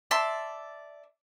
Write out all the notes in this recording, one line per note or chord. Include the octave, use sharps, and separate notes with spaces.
D5 E5 A5 C6